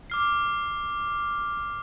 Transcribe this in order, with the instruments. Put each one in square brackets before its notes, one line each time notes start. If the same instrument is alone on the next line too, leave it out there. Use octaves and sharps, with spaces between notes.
[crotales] D6 F6 C7